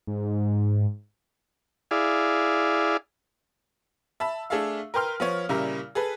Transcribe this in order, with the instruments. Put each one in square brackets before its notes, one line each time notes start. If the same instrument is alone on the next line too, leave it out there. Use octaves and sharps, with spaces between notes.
[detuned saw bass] G#2
[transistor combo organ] E4 G#4 D5 F5
[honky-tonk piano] E5 A5 B5 E6
A3 D4 G#4 A4 E5 F5
A#4 B4 G5 C6 F6
F3 B3 C#5
A#2 C#3 G3 E4 A#4
G#4 A4 B4